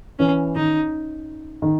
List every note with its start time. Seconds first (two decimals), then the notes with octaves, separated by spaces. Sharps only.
0.19 E3 C#4
0.56 D#3 D#4
1.62 D#3